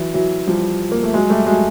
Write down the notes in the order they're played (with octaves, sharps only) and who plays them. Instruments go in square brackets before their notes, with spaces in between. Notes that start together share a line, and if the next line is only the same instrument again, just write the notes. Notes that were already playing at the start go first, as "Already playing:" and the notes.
Already playing: [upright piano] E3 F#3
E3 F#3
F3 G3
A#3
A3
F#3 G#3
G3 A3
F#3 G#3